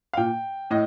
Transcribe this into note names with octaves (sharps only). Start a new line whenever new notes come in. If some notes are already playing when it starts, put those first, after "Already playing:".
F5
A#2 G5
A2 D#5